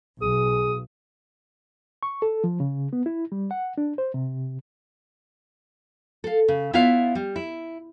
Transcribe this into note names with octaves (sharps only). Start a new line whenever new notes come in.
B1 G#4 D#6
C#6
A4
F3
C#3
B3
E4
G3
F#5
D4
C5
C3
A4 F5
C#3
B3 E4 F4 C#5 E5 F5
G3
E4